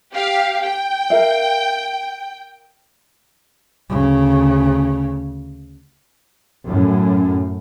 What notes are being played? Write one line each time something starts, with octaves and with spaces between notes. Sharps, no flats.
G4 F5
G5
A#4 E5 F5
D2 C#3
F#2 A2